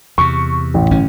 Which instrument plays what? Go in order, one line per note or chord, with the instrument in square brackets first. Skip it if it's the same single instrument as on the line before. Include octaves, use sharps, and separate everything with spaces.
[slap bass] E2 C3 [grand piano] C#6
[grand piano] A1
[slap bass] G1 A2 C#4